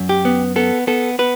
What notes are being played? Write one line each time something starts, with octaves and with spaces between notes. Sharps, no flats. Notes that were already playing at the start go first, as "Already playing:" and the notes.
Already playing: F#2
G4
B3
B3 A4
B3 A4
B3 B4